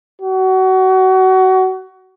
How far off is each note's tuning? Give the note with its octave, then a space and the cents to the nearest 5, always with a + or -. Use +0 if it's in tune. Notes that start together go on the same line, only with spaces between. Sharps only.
F#4 +25